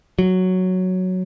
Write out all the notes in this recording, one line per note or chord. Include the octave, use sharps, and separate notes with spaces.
F#3